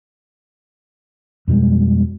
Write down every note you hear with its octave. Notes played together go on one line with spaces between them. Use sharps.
F2 B2 G3 G#3